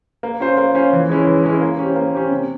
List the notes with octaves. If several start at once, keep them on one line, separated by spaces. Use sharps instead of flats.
A#3
C#4 F4 C5
A#3
C#4 F4 C5
E3
G#3 C#4 E4
E3
G#3 C#4 E4
A#3
C#4 G4 C5
A#3
C#4 G4 C5
C3